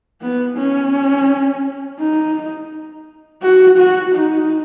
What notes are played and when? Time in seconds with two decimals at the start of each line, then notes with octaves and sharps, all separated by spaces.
0.21 B3
0.57 C#4
1.99 D#4
3.43 F#4
3.77 F#4
4.14 D#4